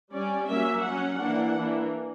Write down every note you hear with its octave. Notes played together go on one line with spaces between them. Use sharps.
G3 C#4 D5
F#3 A#3 C#4 E5
F#3 C#4 F#5
E3 A#3 D4
E3 A#3 D4